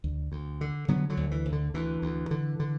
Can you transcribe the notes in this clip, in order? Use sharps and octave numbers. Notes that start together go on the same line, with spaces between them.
D2
D2
D3
D3 F#3 B3
D3 F#3
D2
E3
D2
D3
D2 E3
D2
D3
D3